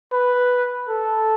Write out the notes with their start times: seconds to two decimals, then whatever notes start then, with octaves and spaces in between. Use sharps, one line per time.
0.12 B4
0.88 A4